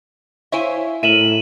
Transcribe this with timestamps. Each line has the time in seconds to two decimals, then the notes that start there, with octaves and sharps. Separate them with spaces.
0.52 E4 C5 C#5 E5 F5 G#5
1.03 A2 A#4 E5 D#7 E7 F#7